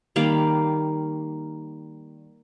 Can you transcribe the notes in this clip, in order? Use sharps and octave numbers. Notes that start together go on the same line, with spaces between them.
D#3 G3 A#3 F5